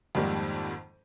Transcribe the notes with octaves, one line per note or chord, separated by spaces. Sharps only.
F2 G#2 D#3 G3 A#3